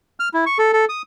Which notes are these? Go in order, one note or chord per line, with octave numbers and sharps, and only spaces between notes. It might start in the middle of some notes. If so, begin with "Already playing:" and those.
F6
E4
C#6
A4
A4
D#6